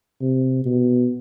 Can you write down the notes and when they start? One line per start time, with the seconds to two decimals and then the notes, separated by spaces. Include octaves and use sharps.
0.21 C3
0.65 B2